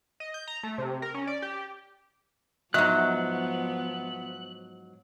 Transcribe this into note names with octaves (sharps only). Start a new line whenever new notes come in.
D#5
G6
A#5
A3
C3
A#4
C#4
D5
G4
G#2 F3 F#3 B3 D#5 E5 F#6